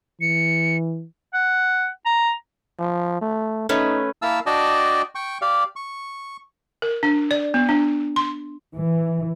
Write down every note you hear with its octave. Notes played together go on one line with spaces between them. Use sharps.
E3 C#7
F#5
A#5
F3
A3
A3 C#4 D#4 B4
A#3 E4 F5 A5 E6
D4 F#4 D5 D#5 G5 A5
G5 C#6
G4 D5 F5
C#6
A#4
D4
D5
B3
D4
C6
E3